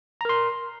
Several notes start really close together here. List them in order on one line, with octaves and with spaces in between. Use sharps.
A#5 A#4 C6